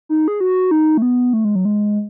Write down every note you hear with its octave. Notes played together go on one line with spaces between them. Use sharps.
D#4
G#4
F#4
D#4
A3
B3
A3
G#3
F#3
G#3